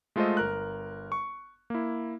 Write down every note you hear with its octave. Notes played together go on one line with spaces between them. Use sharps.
G#3 A3 F4 A4 C5 D#5
G1 A#4 F#6
C#6
A#3 E4